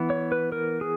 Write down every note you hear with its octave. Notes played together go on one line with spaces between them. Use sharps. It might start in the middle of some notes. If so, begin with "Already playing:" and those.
Already playing: E3 B3
C#5
B4
A#4
G#4